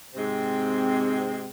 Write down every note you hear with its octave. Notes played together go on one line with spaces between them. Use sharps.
G#2 C3 G#3 C4